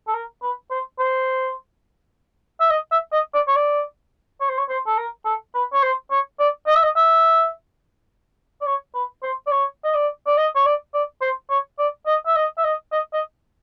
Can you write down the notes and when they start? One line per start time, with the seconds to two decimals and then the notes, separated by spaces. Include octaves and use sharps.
0.07 A4
0.14 A#4
0.42 B4
0.71 C5
0.99 C5
2.60 E5
2.70 D#5
2.91 E5
3.12 D#5
3.34 D5
3.47 C#5
3.56 D5
4.40 C#5
4.49 C5
4.58 C#5
4.69 C5
4.86 A4
4.97 A#4
5.25 A4
5.54 B4
5.73 C#5
5.83 C5
6.10 C#5
6.39 D5
6.67 D#5
6.75 E5
6.83 D#5
6.96 E5
8.61 D5
8.66 C#5
8.94 B4
9.23 C5
9.47 D5
9.51 C#5
9.84 D#5
9.94 D5
10.27 D5
10.37 D#5
10.55 C#5
10.66 D5
10.94 D5
11.21 C5
11.50 C#5
11.79 D5
12.06 D#5
12.26 E5
12.36 D#5
12.57 E5
12.64 D#5
12.92 D#5
13.13 D#5